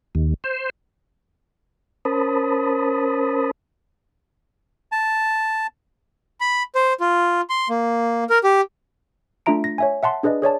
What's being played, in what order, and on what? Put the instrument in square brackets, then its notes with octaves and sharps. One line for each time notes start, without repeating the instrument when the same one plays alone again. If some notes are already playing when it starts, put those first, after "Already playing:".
[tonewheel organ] D#2
C5
C#4 A#4 C5 A5 B5 D#6
[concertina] A5
[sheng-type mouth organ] B5
C5
F4
C6
A#3
A#4
G4
[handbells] A3 D4 F4 E5 A#5 D7
A#6
C#5 E5 G#5
E5 F#5 A5 C6
D4 G#4 B4 D5 D#5
G#4 C#5 D5 A5